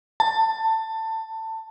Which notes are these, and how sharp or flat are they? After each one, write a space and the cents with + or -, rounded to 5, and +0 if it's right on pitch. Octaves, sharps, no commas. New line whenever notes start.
A5 +20